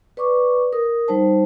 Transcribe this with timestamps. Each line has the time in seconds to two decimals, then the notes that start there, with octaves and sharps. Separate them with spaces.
0.17 B4 D5 C#6 D6
0.73 A#4 D#6
1.08 G3 D#4 C5 A5